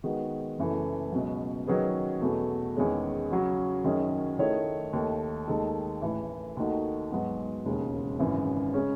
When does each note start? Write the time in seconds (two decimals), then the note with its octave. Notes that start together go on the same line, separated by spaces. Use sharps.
0.03 D#3 G#3 B3 F#4
0.59 F#1 F#2 E3 A3
1.12 C#2 B2 F#3
1.67 D#3 F#3 C#4 G#4 B4
2.21 E2 B2 F#3 A3
2.76 E2 D#3 G#3 C#4
3.30 C#3 F#3 C#4 F#4
3.84 F#2 D#3 F#3 C#4 G#4
4.39 D#3 A3 E4 G#4 C#5
4.93 D#2 D#3 A3
5.48 D#2 D#3 G#3 D#4 A4
6.02 A1 A2 E3
6.57 D#2 D#3 A3 D#4 F#4
7.11 G#2 F#3 B3 F#4
7.66 E1 D#2 C#3 G#3
8.19 G#1 F#2 C#3 E3
8.74 C#3 G#3 C#4